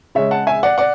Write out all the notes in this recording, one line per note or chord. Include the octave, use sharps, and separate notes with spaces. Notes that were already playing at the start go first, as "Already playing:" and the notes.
C#3 G#3 C#5 E5
F#5 A5
E5 G#5
D5 F#5
D5 F#5